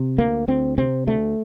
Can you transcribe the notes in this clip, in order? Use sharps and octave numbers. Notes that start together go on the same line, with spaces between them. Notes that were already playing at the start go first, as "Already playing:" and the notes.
Already playing: C3
D2 A#3
D2 C4
C3 C4
D2 A3